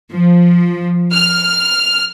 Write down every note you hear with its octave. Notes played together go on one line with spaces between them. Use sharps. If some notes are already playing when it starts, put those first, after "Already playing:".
F3
F6